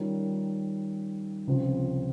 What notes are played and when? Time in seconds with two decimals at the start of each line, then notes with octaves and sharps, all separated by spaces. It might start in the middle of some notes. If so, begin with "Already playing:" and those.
Already playing: D#3 G3 C#4 F4 A#4
1.47 C#2 C3 F3 C4